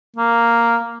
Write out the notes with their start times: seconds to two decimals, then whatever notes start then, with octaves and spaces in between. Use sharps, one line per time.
0.16 A#3